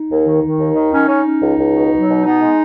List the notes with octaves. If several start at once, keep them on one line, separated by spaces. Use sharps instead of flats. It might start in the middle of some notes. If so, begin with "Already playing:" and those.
Already playing: D#4
D#2
D#3
D#3
D#2
D#3
C#4 D#4
C#4
C#4
C#2
C#2
B2
F#3
B2
B3 D#4
G#3